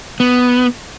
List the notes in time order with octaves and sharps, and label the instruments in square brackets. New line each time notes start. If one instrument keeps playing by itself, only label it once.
[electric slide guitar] B3